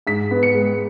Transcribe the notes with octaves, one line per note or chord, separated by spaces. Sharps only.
G#2 B6
B3
C#7
G#3